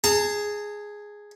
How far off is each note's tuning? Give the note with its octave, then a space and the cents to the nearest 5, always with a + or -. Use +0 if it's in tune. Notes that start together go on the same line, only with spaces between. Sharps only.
G#4 +0 A5 +40